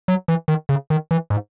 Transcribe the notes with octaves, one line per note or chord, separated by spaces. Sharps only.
F#3
E3
D#3
C#3
D#3
E3
G#2